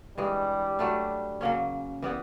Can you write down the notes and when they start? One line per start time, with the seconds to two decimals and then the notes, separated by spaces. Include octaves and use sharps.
0.17 G2 E3 G3 G#3
0.79 F#3 A3 D4
1.41 C#3 F#3 A#3 C#4
2.02 E3 G3 B3